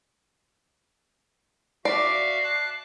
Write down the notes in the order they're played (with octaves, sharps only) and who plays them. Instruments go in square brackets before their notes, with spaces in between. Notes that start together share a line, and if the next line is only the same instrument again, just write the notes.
[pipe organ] F#4 E5 F5 [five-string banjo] D5 [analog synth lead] C7
[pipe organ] A5 D6 F#6